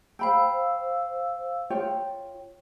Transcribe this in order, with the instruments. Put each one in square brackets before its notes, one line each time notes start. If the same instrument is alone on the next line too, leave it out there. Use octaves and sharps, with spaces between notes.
[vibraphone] C5 F5 E6 [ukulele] G5 B5
[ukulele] F4 C#5 G5